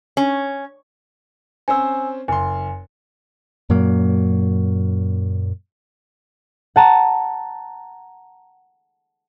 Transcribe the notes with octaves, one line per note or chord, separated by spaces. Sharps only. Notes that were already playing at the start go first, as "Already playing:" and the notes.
C#4
C4 C#4 C5 G#5 E6
F#1 G#5 C6
F#2 A#2 F#3 A#3
F#5 A5 A#5